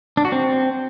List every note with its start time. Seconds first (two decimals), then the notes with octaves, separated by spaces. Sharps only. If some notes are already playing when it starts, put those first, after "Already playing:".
0.17 D4
0.25 F#4
0.32 C4